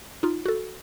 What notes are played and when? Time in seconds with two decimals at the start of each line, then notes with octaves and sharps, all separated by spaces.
0.23 D#4 F4
0.46 F#4 A4